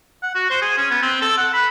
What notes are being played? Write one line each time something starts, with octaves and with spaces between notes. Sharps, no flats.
F#5
F#4
C5
G#4
C#4
B3
C4
A4
F#5
B5